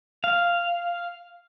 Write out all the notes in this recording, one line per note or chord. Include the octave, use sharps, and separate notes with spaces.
F5